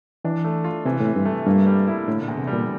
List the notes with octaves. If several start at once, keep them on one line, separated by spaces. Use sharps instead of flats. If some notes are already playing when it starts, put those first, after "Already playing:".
E3 D4
A3
F4
C3 E3
A2 C3
G2
A3
G2 A#3
G3
E4
A2 D3
A#2
E2
C3
G3
A#2